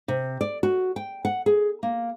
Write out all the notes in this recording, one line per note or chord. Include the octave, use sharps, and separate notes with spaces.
C3
D5
F#4
G5
F#5
G#4
A#3